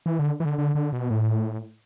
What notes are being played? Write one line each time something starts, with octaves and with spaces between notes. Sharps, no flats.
E3
D3
E3
D3
D3
D3
B2
A2